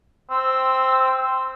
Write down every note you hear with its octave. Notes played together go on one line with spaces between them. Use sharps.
C4 E6